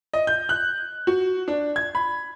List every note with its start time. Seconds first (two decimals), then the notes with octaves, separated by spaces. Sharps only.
0.13 D#5
0.27 G6
0.49 F#6
1.07 F#4
1.48 D4
1.76 G#6
1.95 B5